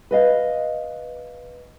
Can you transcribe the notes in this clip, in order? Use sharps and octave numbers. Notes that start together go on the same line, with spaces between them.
B4 D#5 F5